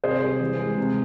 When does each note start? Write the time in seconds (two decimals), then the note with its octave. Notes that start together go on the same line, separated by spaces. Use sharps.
0.04 C3 G#4 C5
0.22 G3
0.40 E3
0.60 G#3
0.78 C3